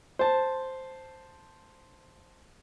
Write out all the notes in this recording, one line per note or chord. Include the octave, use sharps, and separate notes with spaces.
C5 A5